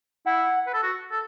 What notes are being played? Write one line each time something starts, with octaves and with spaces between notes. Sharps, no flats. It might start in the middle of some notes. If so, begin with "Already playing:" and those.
E4 F#5
B4
A4
F#4
A4